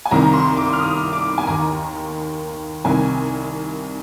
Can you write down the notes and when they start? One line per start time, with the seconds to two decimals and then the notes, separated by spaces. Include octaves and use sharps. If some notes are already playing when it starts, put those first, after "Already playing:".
0.05 G#5
0.11 C2 C3 D#3 A#5
0.33 C6
0.57 D6
0.73 F6
0.80 D#6
1.13 D6
1.38 G#5
1.47 D#2 D#3 A#5
2.84 C2 C3 D#3 G#5